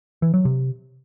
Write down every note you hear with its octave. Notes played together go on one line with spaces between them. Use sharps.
E3
F#3
C3